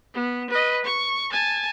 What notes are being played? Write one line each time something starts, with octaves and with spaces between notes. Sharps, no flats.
B3
B4 D#5
C#6
G#5 A5